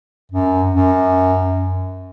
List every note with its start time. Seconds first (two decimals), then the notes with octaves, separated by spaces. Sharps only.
0.32 F#2
0.75 F#2